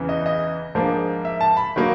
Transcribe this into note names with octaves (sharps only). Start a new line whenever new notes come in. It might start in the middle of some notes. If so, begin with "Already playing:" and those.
Already playing: E2 C#3 E3
D#5
D#5
G#2 F3 A#3 D4
E5
A5
B5
D#3 F#3 A#3